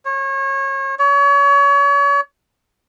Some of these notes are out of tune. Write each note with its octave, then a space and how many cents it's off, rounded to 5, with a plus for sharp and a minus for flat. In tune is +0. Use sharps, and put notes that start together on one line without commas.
C#5 -30
C#5 +35